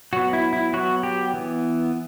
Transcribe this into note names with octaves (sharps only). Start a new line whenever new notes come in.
F#3 B3 F#4
E4
E4
F#3 B3 F#4
G4
E3 B3